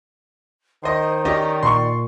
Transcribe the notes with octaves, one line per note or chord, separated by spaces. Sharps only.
D#3 C5 D#5 C6
C#4 G4 D5 D#5
A#2 C6 C#6